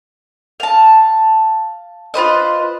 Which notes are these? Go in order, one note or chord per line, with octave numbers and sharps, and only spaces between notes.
F5 A5
F4 B4 C5 D#5